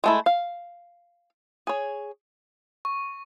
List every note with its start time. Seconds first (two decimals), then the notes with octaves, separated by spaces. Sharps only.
0.04 G#3 A3 E4
0.26 F5
1.67 G#4 C#5
2.85 C#6